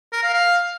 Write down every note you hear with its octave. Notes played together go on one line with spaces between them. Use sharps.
A#4
F5
F5